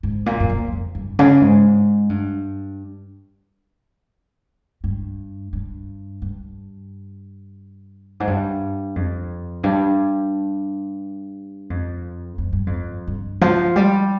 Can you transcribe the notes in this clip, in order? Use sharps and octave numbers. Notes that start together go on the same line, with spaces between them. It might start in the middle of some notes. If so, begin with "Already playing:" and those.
G#2
A#2
G2
F2
F2
G2
C#3
G#2
G2
G2
G2
G2
G#2
G2
F2
G2
F2
F2
G2
F2
G2
F3
G3